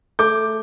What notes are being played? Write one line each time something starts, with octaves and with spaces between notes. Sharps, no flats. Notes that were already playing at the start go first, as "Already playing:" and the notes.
A3 D6 G6